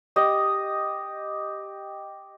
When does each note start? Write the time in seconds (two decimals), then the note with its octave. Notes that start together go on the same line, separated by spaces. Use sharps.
0.16 G4 D#5